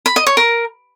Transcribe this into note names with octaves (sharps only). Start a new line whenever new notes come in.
B5
D#5
C#5
A#4